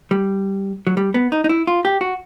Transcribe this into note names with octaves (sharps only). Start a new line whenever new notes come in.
G3
F#3
G3
B3
D#4
D#4
E4
F4
G4
F#4